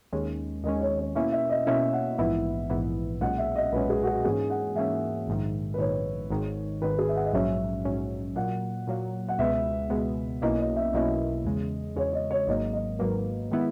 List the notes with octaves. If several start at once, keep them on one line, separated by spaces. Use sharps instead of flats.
D#2 D#3 G#3 C#4
D#2 D#3 G#3 C#4 D#5
C#5
C#5
B2 A#3 C#4 E4 E5
E5
D#5
B2 A#3 C#4 E4 E5
F#5
A#1 G#2 E3 B3 E4 E5
A#1 G#2 E3 B3 E4
B1 A#2 G#3 C#4 F#5
E5
D#5
B1 A#2 G#3 C#4 B4
G#4
F#4
G#4
G#2 E3 A#3 C#4 G#4
F#5
G#2 E3 A#3 C#4 E5
A#1 G#2 D#3
B4
A#1 G#2 D#3 C#5
G#1 G#2 D#3
G#1 G#2 D#3 B4
G#4
E5
F#5
D#5
A#1 G#2 F#3 C#4 E5
A#1 G#2 F#3 C#4
A#2 F#3 A#3 F#5
A#2 F#3 A#3
F#5
C#2 B2 G#3 B3 E5
C#2 B2 G#3 B3
B1 B2 A#3 C#4 E4 D#5
D#5
E5
B1 B2 A#3 C#4 E4 D#5
E2 C#3 G#3
E2 C#3 G#3 C#5
D#5
C#5
G#1 G#2 F#3 A#3 D#5
D#5
G#1 G#2 F#3 A#3 B4
D#3 G#3 B3 E4